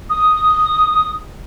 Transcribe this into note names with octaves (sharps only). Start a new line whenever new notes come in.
D#6